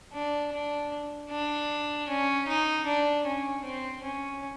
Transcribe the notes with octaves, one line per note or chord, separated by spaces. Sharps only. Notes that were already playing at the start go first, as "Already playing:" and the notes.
D4
D4
D4
C#4
D#4
D4
C#4
C4
C#4